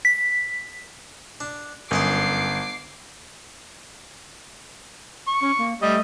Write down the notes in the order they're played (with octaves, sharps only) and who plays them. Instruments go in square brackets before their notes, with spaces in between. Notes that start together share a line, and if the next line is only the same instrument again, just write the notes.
[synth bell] B6
[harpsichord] D4
[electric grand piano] G1 [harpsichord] F#2 D#5 C6 [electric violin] D6 C7
[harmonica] C#6
[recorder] C#4
A#3
[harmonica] G3 [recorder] A3 [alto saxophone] D#5